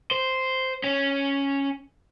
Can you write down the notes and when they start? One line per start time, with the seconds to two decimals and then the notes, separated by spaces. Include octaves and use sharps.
0.11 C5
0.84 C#4